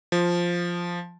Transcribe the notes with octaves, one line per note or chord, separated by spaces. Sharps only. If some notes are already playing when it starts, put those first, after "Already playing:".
F3